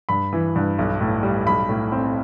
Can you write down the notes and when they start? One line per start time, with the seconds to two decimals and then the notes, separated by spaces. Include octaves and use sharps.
0.09 G2 B5
0.33 E3
0.56 G2
0.78 B1
1.01 A2
1.23 G3
1.46 B1 B5
1.69 A2
1.92 C4